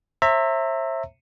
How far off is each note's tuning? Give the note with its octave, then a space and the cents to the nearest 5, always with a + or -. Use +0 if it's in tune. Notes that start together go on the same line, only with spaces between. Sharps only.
C5 +45 E5 +0 A#5 -30